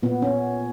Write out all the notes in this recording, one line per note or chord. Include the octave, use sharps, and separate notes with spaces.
A#2 B3
C#4